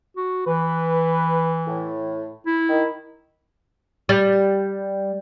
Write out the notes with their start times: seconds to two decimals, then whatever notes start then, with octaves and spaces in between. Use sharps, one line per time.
0.17 F#4
0.47 E3 B4
1.67 A2
2.47 E4
2.69 D#3
4.09 G3